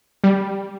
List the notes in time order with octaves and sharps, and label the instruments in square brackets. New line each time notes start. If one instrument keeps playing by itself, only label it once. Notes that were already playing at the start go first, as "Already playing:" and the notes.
[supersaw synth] G3